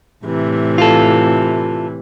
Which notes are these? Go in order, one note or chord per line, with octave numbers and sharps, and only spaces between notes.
A2 C3 E3
F4 A4